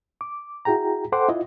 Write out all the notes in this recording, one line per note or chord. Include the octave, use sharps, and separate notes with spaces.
D6
E4 F#4 G#4 G5 A#5
A4 C5 F#5 G5 C6 D6
E4 F4 D#5